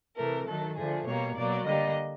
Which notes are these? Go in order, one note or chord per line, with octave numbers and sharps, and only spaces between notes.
C3 E3 A3 A#4
D#3 F#3 A3 A4
D3 F3 A3 G#4
B2 G3 A#3 C#5
B2 F#3 A#3 D5
D3 G3 A#3 D#5